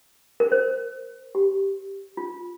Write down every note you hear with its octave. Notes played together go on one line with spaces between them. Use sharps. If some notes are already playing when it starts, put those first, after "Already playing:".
A#4
C5
G4
F4